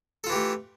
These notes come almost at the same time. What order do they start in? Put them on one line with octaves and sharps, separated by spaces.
A4 F4 E3 G4 A3